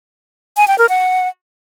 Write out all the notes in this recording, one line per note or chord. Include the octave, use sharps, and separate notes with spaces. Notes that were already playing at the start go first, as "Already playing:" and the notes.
G#5
G5
A#4
F#5